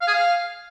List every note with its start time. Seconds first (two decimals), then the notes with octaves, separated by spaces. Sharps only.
0.01 F5
0.07 G#4
0.14 F5